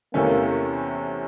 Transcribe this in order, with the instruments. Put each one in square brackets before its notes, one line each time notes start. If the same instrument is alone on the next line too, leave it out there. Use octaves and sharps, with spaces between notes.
[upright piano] E2 C3 E3 A3 C#4 [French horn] A#3